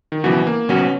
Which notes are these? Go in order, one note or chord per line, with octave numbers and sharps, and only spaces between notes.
D#3
C#3 E3 F#3 B3 F#4
A#3
C#3 F#3 B3 C#4 F#4